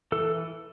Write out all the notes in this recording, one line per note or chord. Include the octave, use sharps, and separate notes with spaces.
E3 A4